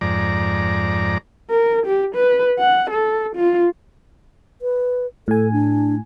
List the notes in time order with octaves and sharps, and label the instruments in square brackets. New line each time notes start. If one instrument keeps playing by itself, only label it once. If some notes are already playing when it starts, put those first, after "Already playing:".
[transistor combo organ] F2 G#2 D5 A#5
[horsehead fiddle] A#4
G4
B4
F#5
A4
F4
[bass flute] B4
[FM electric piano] A2 G#5 [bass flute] A4
[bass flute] D4